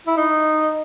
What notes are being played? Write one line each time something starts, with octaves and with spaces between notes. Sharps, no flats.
E4
D#4